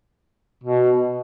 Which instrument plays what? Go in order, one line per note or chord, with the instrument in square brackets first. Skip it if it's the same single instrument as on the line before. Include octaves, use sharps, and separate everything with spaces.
[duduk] B2